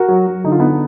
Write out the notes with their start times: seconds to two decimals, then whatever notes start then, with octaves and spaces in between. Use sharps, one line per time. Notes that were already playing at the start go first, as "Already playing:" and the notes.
Already playing: F#4 A#4
0.08 F#3
0.27 F#3
0.44 D3 D#4
0.52 F4
0.60 B3 D#4